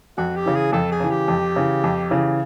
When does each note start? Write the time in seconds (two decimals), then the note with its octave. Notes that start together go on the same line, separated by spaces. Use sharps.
0.18 F2 F#4
0.36 G4
0.46 C#3 E3
0.55 G#4
0.73 F2 A4
0.92 G#4
1.00 C#3 E3
1.10 G4
1.28 F2
1.56 C#3 E3
1.84 F2
2.11 C#3 E3